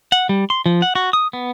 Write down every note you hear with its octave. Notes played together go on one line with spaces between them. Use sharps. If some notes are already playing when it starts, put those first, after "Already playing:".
F#5
G3
C6
F3
F#5
F#4
D#6
B3